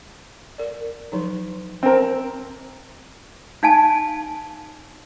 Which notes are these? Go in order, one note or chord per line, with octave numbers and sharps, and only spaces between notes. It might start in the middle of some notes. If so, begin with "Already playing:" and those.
A#4 D5
F3 F#3 D#4
C4 A#4
D#4 F5 G#5 A5